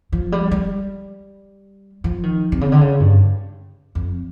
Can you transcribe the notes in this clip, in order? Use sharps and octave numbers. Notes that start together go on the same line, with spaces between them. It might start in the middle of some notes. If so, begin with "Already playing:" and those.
F3
G3
G3
F3
D#3
C3
C#3
D3
C#3
G2
F2